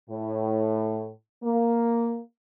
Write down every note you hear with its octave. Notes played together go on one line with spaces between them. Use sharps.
A2
A#3